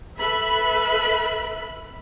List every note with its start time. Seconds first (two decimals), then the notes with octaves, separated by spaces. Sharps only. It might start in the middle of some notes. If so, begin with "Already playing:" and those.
0.19 A4 B4 E5 B5